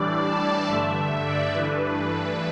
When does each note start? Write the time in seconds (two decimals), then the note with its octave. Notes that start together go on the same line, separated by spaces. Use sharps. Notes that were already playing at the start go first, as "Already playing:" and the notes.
Already playing: A2 E3 G3 D4 D5
0.25 A5
0.68 G2 D3 A3 E5
0.96 E5
1.25 D5
1.55 G2 E3 A3 D4 B4